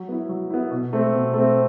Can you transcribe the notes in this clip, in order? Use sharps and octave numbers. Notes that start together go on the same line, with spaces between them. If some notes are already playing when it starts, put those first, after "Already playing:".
Already playing: F#3
B3 E4
F#3
B3 E4
B2
A3 C4
B2
A3 C4